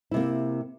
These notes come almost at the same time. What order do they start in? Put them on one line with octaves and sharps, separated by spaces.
E4 C3 A#3